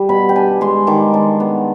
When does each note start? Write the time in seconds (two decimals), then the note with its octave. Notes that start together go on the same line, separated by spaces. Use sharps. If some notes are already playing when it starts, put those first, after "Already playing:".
Already playing: G3
0.09 B2 B5
0.29 G5
0.36 D4 G#5
0.61 G#3 C6
0.87 D#3 D6
1.14 D4
1.40 B3